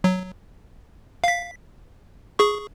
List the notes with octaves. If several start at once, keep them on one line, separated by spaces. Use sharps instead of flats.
F#3
F5 B6
G#4 C#6